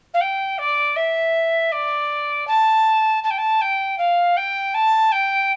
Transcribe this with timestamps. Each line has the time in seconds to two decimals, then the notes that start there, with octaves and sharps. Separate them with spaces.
0.13 F5
0.20 G5
0.58 D5
0.96 E5
1.71 D5
2.47 A5
3.23 A5
3.30 G5
3.37 A5
3.61 G5
3.98 F5
4.36 G5
4.74 A5
5.11 G5